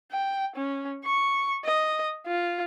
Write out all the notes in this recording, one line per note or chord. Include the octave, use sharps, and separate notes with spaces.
G5
C#4
C#6
D#5
F4